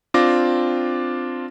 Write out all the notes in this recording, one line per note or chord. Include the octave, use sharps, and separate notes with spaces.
C4 D4 F4 D6 A#6